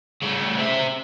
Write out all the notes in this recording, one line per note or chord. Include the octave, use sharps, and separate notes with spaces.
C#3 A3
C4 E5